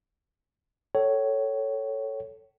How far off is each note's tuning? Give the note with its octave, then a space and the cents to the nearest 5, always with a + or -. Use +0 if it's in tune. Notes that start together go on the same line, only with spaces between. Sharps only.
A4 +0 C#5 +0 G5 -45